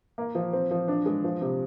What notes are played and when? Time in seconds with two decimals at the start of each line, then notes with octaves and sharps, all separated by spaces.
0.18 A#3
0.35 F3
0.53 C4
0.71 F3
0.88 D4
1.06 G#3
1.24 F3
1.41 C3